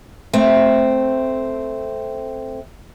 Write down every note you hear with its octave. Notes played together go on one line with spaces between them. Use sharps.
A3 C4